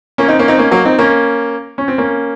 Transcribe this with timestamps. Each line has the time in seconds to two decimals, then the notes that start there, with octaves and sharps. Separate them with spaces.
0.18 A#3 C#4
0.28 C4 D#4
0.39 A#3 C#4
0.48 C4 D#4
0.58 A#3 C#4
0.71 F#3 A#3
0.85 C4 D#4
0.99 A#3 C#4
1.78 C#4
1.88 C4
1.98 A#3 C#4